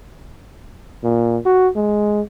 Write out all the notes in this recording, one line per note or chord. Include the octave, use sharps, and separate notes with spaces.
A#2
F#4
G#3